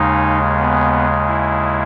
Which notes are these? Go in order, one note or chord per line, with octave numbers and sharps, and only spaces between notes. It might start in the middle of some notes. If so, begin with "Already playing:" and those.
Already playing: D#2 C#3 G#3 D#4
B3
E4